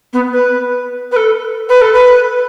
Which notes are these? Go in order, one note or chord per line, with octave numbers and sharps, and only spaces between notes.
B3
B4
B4
A4
B4
A4
B4